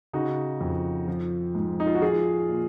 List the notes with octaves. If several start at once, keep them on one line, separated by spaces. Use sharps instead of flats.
C#3 D#4 F#4
F2
F3
G#2
D#4
F4
F#4
F3 F4 G#4
A#2